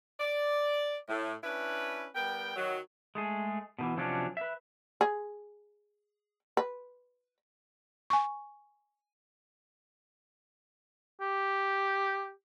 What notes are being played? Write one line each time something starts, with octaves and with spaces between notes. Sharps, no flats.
D5
A2
C#4 D4 E4 B4
G3 B3 A#4 G5
D#3 F#3
G#3 A3 G#4
B2 D#3 E3
C3 F3 F#3 C#4 D4 F4
B4 E5
G#4
B4
G#5 C#6
G4